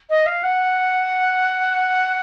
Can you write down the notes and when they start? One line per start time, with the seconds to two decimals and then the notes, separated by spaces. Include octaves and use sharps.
0.10 D#5
0.26 F5
0.43 F#5